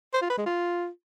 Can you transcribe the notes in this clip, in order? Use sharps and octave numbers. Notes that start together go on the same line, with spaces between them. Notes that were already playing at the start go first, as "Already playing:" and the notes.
C5
F4
B4
G#3
F4